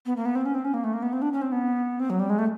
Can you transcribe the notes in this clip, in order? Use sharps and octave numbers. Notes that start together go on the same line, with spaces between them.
B3
A#3
B3
C4
C#4
C4
C#4
A#3
A3
A#3
B3
C4
D4
C#4
C4
B3
C4
F#3
G3
G#3
A3